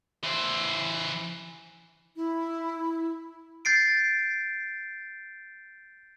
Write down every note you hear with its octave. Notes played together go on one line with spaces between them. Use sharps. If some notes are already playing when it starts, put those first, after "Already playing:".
E3 C5
E4
G6 A6 C7 D7